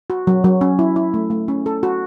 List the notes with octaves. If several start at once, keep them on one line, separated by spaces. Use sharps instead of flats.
F#4
F#3
F#3
C#4
E4
E4
A3
A3
C#4
A4
F#4